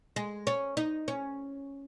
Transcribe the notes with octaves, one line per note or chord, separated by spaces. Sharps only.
G#3
C#4
D#4
C#4